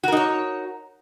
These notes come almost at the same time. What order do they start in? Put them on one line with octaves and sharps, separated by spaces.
F#4 A#4 D#4 C#5